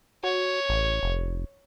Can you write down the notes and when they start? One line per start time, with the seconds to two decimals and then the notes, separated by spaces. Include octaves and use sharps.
0.24 F#4 C#5
0.69 A1
1.03 F1